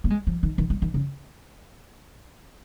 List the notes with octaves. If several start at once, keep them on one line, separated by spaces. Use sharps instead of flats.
A#3
G#3
F3
D#3
D#3
G#3
D#3
C#3